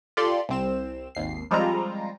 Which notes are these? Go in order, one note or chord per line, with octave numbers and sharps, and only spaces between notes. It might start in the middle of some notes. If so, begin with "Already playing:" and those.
F4 G4 A4 D5 C6
C2 C4 E7
G#1 D#2 C7
F3 G3 G#3 C4 F4 A#5